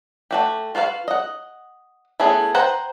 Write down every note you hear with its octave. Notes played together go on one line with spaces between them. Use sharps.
A3 F#4 G4
F4 F#4 B4 C#5 F5
D#5 F#5
A3 B3 C#4 E4 G#4
B4 C5 F#5 G5 A#5